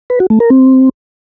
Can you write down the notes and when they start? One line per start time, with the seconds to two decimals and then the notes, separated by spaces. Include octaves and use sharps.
0.10 B4
0.20 F#4
0.30 A3
0.40 A#4
0.50 C4